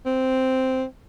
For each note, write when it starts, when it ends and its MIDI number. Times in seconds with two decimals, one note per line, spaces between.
0.06 0.85 60